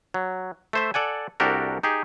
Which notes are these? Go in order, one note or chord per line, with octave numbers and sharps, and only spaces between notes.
F#3
A3 C5 E5
A4 D5 F#5 G#5
C2 D4 F#4 G4 A4 A#4
D#4 G4 G#4